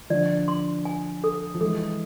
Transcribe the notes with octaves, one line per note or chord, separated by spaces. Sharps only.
D3 F3 D5
C6
G#5
A4
F3
E3 G#3 A4